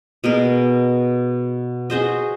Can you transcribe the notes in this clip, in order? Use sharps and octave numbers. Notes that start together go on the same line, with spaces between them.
B2 G#4 A#4
F#4 G#4 C5 D#5